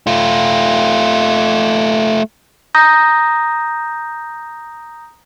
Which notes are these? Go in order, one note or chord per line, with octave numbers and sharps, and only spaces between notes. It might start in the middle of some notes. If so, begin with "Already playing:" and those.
A3 F4
A#5 D#6 G6 A#6